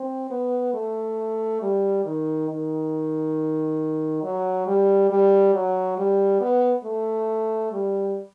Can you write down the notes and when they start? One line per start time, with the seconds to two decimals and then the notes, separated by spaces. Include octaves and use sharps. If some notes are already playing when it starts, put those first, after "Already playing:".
Already playing: C4
0.30 B3
0.74 A3
1.62 G3
2.05 D#3
2.49 D#3
4.23 F#3
4.67 G3
5.10 G3
5.54 F#3
5.98 G3
6.41 B3
6.84 A3
7.72 G3